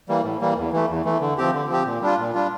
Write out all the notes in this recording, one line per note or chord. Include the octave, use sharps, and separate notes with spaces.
E3 G3 A#3
A2
E3 G3 A#3
E2
E3 A3
E2
E3 A3
D3
F3 C4 G4
D3
F3 C4 G4
A#2
G3 D4 F4
A#2
G3 D4 F4